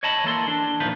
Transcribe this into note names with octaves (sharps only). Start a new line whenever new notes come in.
C#5 D#5 A5 B5
E3 A#3 A4 C6
D4
E2 A#2 D#3 F3 B4 C5